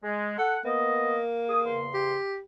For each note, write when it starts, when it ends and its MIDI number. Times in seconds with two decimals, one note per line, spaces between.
0.03 0.36 56
0.38 0.59 69
0.38 0.59 78
0.64 1.87 58
0.64 1.19 59
0.64 1.19 75
1.49 1.60 68
1.49 1.60 87
1.65 2.16 40
1.65 2.16 49
1.65 2.16 84
1.94 2.40 67